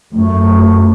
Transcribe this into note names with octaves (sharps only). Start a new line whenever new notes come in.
F#2 A3